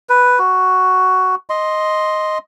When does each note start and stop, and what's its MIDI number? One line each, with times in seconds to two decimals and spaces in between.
0.09 0.39 71
0.39 1.35 66
1.50 2.38 75
1.50 2.38 84